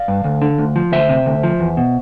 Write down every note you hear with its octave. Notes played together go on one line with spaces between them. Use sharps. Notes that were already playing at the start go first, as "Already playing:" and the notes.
Already playing: D5 F5
G2
D2
D3
D2
F3
D2 C5 E5
C3
D2
F3
E2
B2